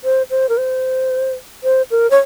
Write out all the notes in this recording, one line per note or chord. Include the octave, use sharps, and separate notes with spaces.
C5
C5
A#4
C5
C5
A#4
C#5